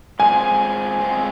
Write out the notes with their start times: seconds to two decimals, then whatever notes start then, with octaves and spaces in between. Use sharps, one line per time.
0.20 G#3 C4 F4 G#4 G#5
1.00 G#3 C4 F4 G#4